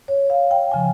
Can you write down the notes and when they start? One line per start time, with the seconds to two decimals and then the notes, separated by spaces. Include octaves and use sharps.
0.08 C#5
0.30 F5
0.51 G5
0.71 C#3 F3 G#5